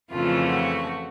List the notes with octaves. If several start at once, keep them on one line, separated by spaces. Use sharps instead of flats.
F2 C#3 E3 A3 F4
F#4